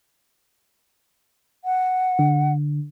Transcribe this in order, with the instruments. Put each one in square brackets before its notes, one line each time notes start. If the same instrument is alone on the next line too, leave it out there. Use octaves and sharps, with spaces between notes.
[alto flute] F#5
[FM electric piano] D3